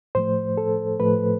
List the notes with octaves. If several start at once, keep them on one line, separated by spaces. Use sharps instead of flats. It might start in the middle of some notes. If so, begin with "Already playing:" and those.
A2 F3 A3 C5
A4
A2 F3 A3 B4